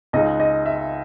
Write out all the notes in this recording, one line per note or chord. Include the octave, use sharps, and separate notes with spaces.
C#2 C#3 G#3 D#4 D#5
D#5
E5